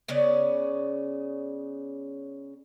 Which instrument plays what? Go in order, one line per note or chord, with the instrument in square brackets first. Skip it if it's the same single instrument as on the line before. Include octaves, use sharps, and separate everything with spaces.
[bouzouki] C#3 B3 C#4 D5